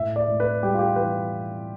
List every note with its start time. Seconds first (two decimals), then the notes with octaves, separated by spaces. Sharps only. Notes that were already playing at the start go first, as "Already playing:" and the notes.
Already playing: A2 E5
0.16 D5
0.28 A2
0.40 B4
0.62 G3 G4
0.74 F4
0.79 G4
0.96 E3 B4